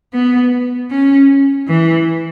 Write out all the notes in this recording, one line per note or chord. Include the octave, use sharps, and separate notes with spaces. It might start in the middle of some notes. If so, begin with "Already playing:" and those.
B3
C#4
E3